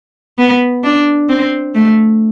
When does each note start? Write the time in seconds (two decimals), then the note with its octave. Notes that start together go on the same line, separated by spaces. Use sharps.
0.39 B3
0.84 D4
1.29 C4
1.75 A3